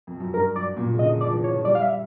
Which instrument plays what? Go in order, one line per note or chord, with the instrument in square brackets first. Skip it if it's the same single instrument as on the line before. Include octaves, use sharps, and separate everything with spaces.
[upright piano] F2
F#2
[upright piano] G2 [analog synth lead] A#4
[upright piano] F#2 [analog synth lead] D5
[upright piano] A#2
C#3
[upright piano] D3 [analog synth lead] D#5
[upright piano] F3 [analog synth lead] D5
[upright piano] E3
[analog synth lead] C#5
[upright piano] F3
[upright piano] G3 [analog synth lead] D5
[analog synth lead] F5
E5